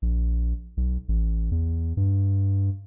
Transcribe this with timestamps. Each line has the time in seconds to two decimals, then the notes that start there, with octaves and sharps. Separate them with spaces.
0.02 A#1
0.77 B1
1.08 A1
1.51 E2
1.97 G2